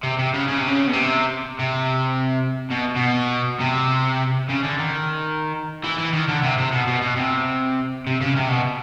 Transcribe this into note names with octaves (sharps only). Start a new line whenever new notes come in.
C3
C3
C#3
C#3
C3
C#3
B2
C3
C3
B2
B2
C3
C#3
D3
D#3
E3
E3
D#3
D3
C3
C3
B2
B2
B2
C3
C3
C#3
C3
B2